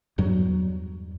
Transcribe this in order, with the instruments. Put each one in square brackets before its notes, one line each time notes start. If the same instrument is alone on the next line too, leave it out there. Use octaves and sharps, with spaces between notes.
[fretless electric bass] E2 G2 F#3